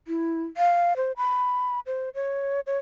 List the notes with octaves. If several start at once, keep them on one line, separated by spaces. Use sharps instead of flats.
E4
F5
C5
B5
C5
C#5
C#5